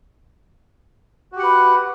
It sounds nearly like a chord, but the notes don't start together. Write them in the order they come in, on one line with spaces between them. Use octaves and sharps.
F#4 G4 F#5 B4